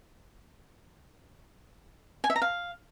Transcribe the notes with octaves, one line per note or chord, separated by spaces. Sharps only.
G#5
E5
A#5
F5